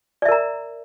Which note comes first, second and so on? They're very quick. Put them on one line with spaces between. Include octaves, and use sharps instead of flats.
D5 E5 A#4 A#5